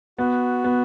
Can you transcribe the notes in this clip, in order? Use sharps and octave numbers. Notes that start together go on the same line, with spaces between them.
B3 F#4
B3